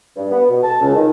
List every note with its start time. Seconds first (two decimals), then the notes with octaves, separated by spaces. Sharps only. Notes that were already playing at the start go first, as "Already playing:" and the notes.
0.16 G2
0.31 B3
0.49 B2
0.63 A5
0.80 C#2
0.95 D#3